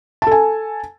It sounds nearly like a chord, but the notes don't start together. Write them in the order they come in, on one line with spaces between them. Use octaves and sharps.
A5 A4 G#5